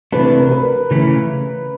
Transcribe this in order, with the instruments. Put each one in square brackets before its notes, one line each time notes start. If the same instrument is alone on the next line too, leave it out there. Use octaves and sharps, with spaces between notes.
[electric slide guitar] C3 E3 A3 D4 [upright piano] B4
[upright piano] A#4
B4
[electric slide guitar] C#3 E3 A3 C#4 E4